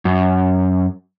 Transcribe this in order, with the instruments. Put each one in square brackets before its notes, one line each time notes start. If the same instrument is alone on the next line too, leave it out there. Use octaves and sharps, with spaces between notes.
[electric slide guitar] F#2